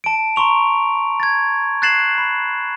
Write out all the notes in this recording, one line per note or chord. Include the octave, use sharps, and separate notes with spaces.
A5 D7
A#5 C6 C#6 F7
G#6 A6
F#6 G#6 A6 C7 E7 F#7
B5